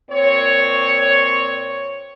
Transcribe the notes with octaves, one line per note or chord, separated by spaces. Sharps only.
A#2 C4 C#5